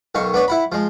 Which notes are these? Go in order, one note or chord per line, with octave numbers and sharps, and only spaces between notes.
B1 D#3 F5 C#6
B3 D4 B4 C#5
E4 F#5 B5
F3 G#3